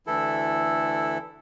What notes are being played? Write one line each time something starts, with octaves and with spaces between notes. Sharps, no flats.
D2 E3 E4 A4